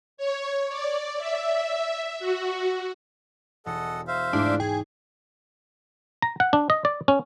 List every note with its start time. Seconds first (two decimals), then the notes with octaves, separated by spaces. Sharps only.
0.17 C#5
0.69 D5
1.18 E5
2.19 F#4
3.66 E1 A4 D#5 F#5
4.07 C5 E5 F5
4.33 G#2 G#3 A3 D4 E4
4.60 G#4 G5
6.22 A#5
6.40 F#5
6.53 D4
6.70 D#5
6.85 D5
7.08 C#4